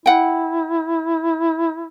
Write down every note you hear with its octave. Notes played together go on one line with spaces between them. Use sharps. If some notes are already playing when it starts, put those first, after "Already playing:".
E4 F#5 G5